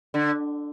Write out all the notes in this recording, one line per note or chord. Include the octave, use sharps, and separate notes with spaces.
D3